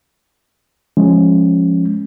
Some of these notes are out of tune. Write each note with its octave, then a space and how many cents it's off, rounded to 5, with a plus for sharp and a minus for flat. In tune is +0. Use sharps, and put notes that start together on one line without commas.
F3 +0 G#3 +0 C#4 +0